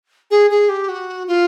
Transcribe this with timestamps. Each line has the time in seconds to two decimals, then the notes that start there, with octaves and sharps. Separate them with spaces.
0.31 G#4
0.51 G#4
0.69 G4
0.89 F#4
1.27 F4